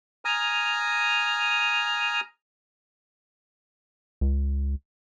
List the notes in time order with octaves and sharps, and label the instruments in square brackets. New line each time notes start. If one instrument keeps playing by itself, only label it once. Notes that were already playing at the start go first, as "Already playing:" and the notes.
[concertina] G#5 A#5 D#6 F6
[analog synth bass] C#2